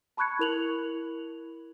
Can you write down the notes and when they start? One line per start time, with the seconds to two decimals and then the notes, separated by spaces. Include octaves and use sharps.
0.17 A5 B5 C#6 F#6 G#6 C#7
0.39 E4 A#4 F7 F#7